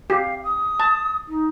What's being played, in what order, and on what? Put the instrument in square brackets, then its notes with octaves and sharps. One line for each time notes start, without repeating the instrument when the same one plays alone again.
[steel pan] G4 [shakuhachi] F5
[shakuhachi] D#6
[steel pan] A5
[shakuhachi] D#4